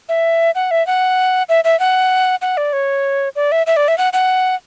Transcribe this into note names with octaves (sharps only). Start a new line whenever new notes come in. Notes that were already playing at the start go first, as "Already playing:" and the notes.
E5
F#5
E5
F#5
E5
E5
F#5
F#5
D5
C#5
D5
E5
E5
D5
E5
F#5
F#5